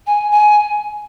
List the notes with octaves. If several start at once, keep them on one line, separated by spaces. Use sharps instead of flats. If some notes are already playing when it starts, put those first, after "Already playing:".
G#5
G#5